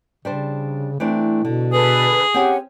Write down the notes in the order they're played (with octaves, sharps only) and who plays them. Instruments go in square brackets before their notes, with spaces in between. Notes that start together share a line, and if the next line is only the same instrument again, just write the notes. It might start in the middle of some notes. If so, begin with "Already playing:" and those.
[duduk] C#3 [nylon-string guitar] G3 D4 C5
[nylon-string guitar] E3 C4 D4 [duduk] A3
[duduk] B2 [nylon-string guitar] D3
[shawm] G#4 [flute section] A4 B4
[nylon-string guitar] C4 C#4 G#5 [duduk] G4 [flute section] F#5